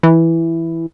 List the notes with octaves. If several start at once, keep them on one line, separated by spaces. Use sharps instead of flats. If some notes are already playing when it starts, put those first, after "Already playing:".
E3